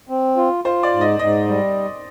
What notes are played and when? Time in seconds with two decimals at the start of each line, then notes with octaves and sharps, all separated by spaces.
0.09 C4
0.37 F4
0.64 F4 C5
0.83 D5
0.92 G#2
1.01 D#5
1.19 G#2 D#5
1.47 G3